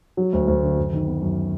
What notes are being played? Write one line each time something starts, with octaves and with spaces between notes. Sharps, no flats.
F#3
D2
D2
D3
F#2
D#3
B3
F#2